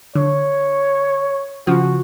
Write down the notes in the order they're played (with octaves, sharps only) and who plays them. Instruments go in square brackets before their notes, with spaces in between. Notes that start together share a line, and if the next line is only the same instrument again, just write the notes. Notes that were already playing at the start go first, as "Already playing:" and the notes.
[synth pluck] D3 [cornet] C#5
[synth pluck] C#3 F3 [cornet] F#4